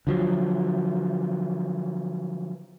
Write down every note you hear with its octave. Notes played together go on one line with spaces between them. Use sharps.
D3 F3 F#3